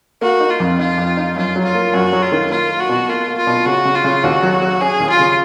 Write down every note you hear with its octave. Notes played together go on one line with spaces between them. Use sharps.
A#3 F#4
D#4
F4
F2
D#4 F4
F2
D#4
F#2 F4
F#3
F4
A#3
F#2 F#4
F#3
F4
D#3
A#3 F4
A#3
F#4
B2
A#3 F4
A#3
F4
B2
C#3 F#4
C#3
F4
C#3
D#2 F#4
F#3
F#3
C#4 G#4
D#2
F4
C#3